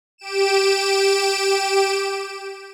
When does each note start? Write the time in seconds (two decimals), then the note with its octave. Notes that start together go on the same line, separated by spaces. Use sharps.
0.18 G4 D7 E7